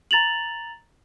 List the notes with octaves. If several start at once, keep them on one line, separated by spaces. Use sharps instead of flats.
A#5 A6 F7 F#7